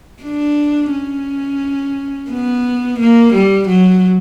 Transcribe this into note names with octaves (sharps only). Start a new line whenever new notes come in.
D4
C#4
B3
A#3
G3
F#3